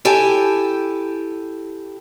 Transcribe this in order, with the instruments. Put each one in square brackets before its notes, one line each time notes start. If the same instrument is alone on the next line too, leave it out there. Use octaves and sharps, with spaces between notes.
[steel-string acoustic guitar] E4 G4 A4 G5 G#5